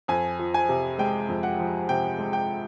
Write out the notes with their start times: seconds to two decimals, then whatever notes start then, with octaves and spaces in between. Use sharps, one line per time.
0.08 F2 G#5
0.39 F3
0.54 G#5
0.69 C3
0.98 G#3 G5
1.28 F2
1.43 F#5
1.59 F3
1.89 C3 G5
2.18 G#3
2.33 G5